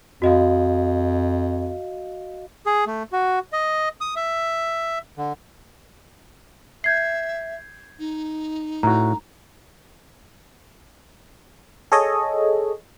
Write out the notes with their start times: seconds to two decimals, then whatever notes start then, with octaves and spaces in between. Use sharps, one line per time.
0.22 F2 F#4 D#5 F5
2.66 G#4
2.87 A3
3.12 F#4
3.53 D#5
4.01 D#6
4.16 E5
5.17 D3
6.84 E5 G6 G#6 C7
7.99 D#4
8.83 A2 F#4 A#5
11.92 G#4 A4 C#5 D#5